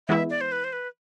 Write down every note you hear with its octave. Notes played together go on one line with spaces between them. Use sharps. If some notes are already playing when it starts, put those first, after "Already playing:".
E3 G#3 B3 E4 E5
D5
C5
B4
C5
B4